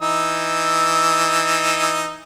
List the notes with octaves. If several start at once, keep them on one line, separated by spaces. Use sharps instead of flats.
E3 D#4 E6